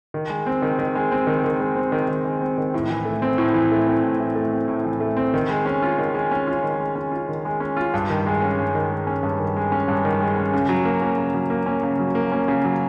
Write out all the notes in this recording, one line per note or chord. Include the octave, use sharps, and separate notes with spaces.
D#3
G#3
C4
D#3
D#3
G#3
C4
D#3
D#3
G#3
C4
D#3
D#3
G#3
C4
D#3
A2
E3
A3
C4
A2
E3
A3
C4
A2
E3
A3
C4
A2
E3
A3
C4
D#3
G#3
C#4
F4
D#3
G#3
C#4
F4
D#3
G#3
C#4
F4
D#3
G#3
C#4
F4
G2
D#3
G#3
C#4
G2
D#3
G#3
C#4
G2
D#3
G#3
C#4
G2
D#3
G#3
C#4
C#3
F#3
A#3
C#4
C#3
F#3
A#3
C#4
C#3
F#3
A#3
C#4
C#3
F#3